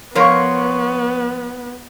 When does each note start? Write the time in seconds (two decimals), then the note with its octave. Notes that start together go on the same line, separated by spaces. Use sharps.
0.15 F3 B3 A#4 C#5 C6 C#6